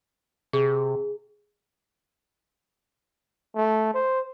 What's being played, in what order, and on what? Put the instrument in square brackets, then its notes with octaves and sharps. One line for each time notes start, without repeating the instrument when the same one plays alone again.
[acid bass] C3 [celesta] G#4
[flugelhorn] A3
C5